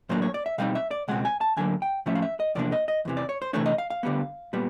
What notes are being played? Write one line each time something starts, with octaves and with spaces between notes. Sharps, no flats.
A2 F#3 A#3 D4 C5
C#5
D5
E5
B2 G3 C4 D#4 F5
E5
D5
C#2 B2 G#3 C4 F#5
G#5
A5
D2 D3 F#3 A#3 G#5
G5
A2 F3 A3 C#4 E5
F5
E5
D#5
E2 C3 F3 A#3 D4 D5
D#5
D#5
E2 C3 E3
D5
C#5
C5
C3 E3 A3 D4 C#5
D#5
F5
F5
D2 D3 G3 B3
A#2 G3 B3